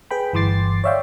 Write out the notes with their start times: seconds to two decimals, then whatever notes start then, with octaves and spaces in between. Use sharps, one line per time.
0.11 G#4 B4 G5 B5
0.33 G1 E3 C6 D6 A6 C7
0.84 C#5 D5 E5 F5 G5